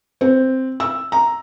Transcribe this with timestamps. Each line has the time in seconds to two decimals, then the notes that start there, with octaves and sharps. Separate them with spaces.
0.21 C4
0.80 E6
1.12 A#5